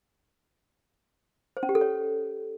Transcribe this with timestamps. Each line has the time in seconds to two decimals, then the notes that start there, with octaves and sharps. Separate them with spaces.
1.57 C5
1.63 C#4
1.69 G4
1.75 A4
1.81 C#5